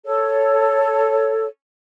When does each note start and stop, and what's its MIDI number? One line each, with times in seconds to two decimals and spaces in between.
0.06 1.46 69
0.06 1.46 73